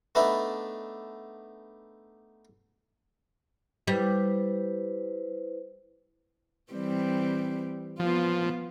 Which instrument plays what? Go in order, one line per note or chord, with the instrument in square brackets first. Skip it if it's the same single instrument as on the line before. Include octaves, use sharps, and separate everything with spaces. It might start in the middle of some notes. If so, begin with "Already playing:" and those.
[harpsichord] A3 B3 D4 D#4 B4 E5
[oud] G3 [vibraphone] E4 B4 C5
[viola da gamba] E3 G3 C4
[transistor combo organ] F3 [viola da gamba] B3 F4